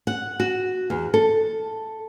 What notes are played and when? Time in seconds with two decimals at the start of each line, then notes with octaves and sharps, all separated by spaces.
0.07 F#5
0.40 F#4
0.90 E2
1.14 A4